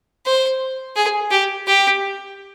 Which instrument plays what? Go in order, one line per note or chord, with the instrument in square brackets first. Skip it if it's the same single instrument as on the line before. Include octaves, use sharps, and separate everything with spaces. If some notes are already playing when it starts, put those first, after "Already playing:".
[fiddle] C5
G#4
G4
G4